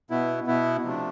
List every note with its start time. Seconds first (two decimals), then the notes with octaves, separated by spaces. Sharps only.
0.10 B2 B3 E4
0.47 B2 B3 E4
0.83 C3 F3 A3 D4